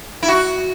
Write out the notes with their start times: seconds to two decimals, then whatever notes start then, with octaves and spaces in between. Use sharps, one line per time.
0.23 E4
0.28 F#4